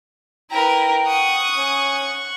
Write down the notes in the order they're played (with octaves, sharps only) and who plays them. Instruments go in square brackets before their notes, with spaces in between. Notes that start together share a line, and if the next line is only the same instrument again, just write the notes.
[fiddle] E4 B4 [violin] A#4 [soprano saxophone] G5
[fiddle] F#5 C#6 [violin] D#6
[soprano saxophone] C#4